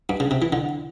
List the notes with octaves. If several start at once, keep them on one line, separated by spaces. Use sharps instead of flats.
G2
C#3
C3
E3
D3